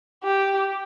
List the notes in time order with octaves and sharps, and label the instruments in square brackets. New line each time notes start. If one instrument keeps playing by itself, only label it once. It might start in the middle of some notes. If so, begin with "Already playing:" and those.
[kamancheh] G4